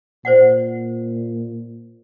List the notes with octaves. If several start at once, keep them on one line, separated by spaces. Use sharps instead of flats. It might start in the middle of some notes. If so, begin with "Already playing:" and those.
A#2 C5 D5 F#5